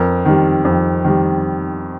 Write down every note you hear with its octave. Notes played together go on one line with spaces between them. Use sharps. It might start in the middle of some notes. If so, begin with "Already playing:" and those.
Already playing: F2 A#4
D#3 G3
F2
D#3 G3